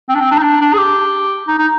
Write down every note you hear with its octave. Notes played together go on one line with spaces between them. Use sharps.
C4
D4
C4
D4
D#4
D4
D4
G#4
G4
D#4
D#4